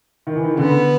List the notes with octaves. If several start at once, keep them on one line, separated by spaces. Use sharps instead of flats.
D#3
E3
D#3
C#3
D3 B3